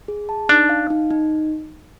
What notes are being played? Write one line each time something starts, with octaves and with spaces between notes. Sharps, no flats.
G#4
A5
D4 D#4
F5
D#4
D#4